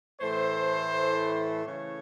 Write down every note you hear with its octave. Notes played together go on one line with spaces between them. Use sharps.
A2 E3 A3 C5
C#3 E3 A3 C#5